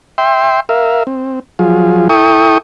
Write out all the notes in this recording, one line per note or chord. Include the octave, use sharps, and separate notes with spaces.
E5 G5 C6
A#4 E5 F5
C4
F3 F#3 F4 G#4
E4 A4 G5 C#6 D#6